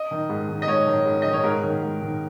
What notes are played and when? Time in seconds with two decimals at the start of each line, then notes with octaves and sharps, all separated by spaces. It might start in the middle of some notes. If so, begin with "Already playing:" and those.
Already playing: D#5
0.11 D#3
0.29 G#2
0.48 D#3
0.62 D#5
0.68 G#2 C#5
0.87 D#3
1.06 G#2
1.22 D#3 D#5
1.33 C#5
1.44 G#2 A#4
1.63 D#3
1.82 G#2
2.01 D#3